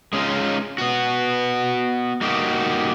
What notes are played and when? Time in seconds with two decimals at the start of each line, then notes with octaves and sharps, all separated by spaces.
0.13 G#3 C#4 D#4 F4
0.78 B3 F#4
2.21 G3 A#3 D#4 F#4 G4